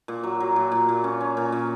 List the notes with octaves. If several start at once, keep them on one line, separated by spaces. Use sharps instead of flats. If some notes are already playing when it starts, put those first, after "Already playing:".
A#2
F#3
F#3
A#2
A#2
A#2
C#4
C#4
A#2
A#2